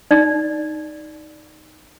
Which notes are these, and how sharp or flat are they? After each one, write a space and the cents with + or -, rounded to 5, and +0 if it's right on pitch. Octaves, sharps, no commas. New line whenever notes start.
D#4 +0 D5 +0